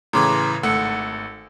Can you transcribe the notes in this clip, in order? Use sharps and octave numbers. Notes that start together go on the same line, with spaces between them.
A2 C#3 E3 A#5 C6 D6
G#1 A3 F#5 E6 C#7